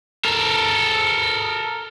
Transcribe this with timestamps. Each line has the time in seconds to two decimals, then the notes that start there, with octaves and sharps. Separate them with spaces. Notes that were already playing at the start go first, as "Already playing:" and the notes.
0.25 A4 A#4